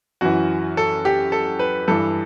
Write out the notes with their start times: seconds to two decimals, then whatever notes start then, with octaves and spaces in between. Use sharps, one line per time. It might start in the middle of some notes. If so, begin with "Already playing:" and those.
0.21 F#2 E3 F#4
0.77 A4
1.05 G4
1.32 A4
1.59 B4
1.88 G2 E3 A4